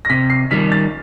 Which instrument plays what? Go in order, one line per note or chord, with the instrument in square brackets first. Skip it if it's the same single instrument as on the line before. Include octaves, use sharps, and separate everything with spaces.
[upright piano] A#6
[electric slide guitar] C3 [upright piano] B6
[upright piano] C7
[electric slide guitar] D#3 G3 [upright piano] B6
[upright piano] A6